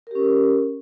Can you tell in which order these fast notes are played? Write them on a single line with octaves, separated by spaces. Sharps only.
A#4 G4 C#4